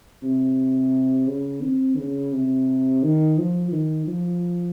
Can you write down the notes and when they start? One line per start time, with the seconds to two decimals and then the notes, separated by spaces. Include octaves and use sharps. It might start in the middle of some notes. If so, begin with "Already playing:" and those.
0.23 C3
1.27 C#3
1.62 C4
1.98 C#3
2.33 C3
3.03 D#3
3.38 F3
3.72 D#3
4.07 F3